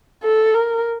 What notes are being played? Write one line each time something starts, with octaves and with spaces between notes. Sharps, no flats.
A4
A#4